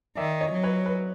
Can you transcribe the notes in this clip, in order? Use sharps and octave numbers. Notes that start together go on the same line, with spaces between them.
D#3 D5 E5
C#5 D#5
F#3
B4 C#5
B4